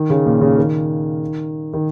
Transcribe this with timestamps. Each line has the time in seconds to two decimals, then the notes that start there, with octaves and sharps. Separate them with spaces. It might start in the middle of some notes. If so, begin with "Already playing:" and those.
Already playing: D#3
0.10 C#3
0.26 A#2
0.41 C#3
0.58 D#3
1.73 D#3